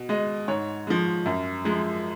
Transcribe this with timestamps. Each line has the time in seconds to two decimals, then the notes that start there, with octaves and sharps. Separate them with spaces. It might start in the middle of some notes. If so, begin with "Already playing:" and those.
Already playing: B2
0.09 G#3 D#5
0.48 G#2 C#5
0.87 F3 G#3
1.26 F#2
1.65 F3 G#3